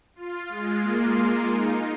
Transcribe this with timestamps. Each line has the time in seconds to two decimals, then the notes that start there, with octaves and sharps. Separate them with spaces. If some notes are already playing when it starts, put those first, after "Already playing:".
0.15 F4
0.49 G#3
0.82 A#3
1.48 D#4